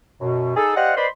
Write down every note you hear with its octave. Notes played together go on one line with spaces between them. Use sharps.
F#2 B2
D#4 G#4 A4
G4 C5 D5 D#5 F5 F#5
B4 C5 D5 D#5 B5 C6